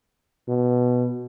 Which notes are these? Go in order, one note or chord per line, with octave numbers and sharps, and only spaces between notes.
B2